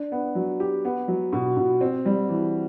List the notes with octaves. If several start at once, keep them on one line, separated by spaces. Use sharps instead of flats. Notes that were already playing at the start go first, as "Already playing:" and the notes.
Already playing: D4
B3
F#3
G4
B3
F#3
B2
B2
C4
G3
E3